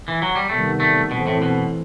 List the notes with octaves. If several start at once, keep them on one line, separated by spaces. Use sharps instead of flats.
E3
F#3
G3
C3 D#3 G3 A3 B3
A3
F#2 B2 E3 A3 C4
A2
B2